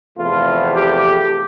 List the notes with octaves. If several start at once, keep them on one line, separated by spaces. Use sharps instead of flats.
E2 C3 F3 A3 F4
G4